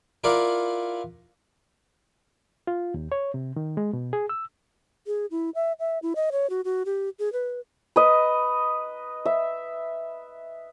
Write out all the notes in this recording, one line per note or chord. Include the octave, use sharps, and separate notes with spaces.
E4 F4 A#4 D5 F5 F#5
F4
D#2
C#5
C3
D#3
G#3
B2
G#4
E6
G#4
E4
E5
E5
E4
D#5
C#5
F#4
F#4
G4
G#4
B4
B4 D#5
E5